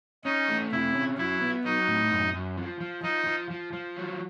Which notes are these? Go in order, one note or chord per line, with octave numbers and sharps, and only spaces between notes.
C#4 D#4
A3
C3 E4
C#4
F#3 E4
B3
F#3 D#4
A2
F#2
F#2
F3
F3
F3 D#4
F3
F3
F3
F#3